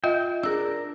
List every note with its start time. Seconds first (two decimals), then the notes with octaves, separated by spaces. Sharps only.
0.04 F4 D#5 E5 G5
0.43 D4 G#4 A#4 E6